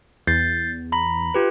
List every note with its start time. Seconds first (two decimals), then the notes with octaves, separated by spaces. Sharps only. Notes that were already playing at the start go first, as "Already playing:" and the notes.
0.27 E2 G6 A6 C7
0.92 A#5 B5
1.34 F4 G4 B4